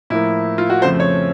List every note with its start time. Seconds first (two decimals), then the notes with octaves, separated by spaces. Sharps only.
0.10 A2 F3 A#3 E4
0.58 F4
0.70 F#4
0.82 F2 C#3 F3 A3 C4 C5
1.00 C#5